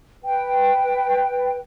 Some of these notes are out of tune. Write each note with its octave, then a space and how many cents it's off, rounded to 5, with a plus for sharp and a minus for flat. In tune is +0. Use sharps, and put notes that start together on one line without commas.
B4 +0 G5 +0